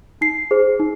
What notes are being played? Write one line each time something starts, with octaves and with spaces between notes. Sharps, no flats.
D#4 C7
G#4 C5
D#4